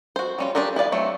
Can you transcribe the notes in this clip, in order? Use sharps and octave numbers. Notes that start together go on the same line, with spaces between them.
F#4 C5
G3 C#4 F4
D4 F4 G4 G#4 A#4
E4 B4 D5 F5
F#3 A3 C4